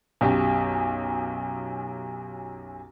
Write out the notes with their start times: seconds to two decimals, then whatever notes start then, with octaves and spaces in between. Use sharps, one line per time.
0.21 B1 F#2 G4